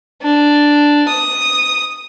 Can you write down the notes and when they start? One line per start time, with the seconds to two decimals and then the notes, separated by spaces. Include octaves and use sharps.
0.22 D4
1.08 D#6